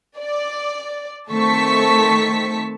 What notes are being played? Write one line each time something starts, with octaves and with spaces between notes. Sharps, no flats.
D5
D#3 A3 C4 A5 C#6 B6